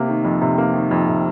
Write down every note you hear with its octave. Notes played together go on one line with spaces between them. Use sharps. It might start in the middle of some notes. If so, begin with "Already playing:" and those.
Already playing: C3 A#3
D#3
F2
C3
A#3
D#3
F2
C3